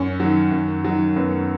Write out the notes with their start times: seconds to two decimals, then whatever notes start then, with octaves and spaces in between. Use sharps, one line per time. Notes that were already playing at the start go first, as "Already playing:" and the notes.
Already playing: F#2 C#4
0.20 D#3 F#3
0.51 F#2
0.84 D#3 F#3
1.16 F#2 B3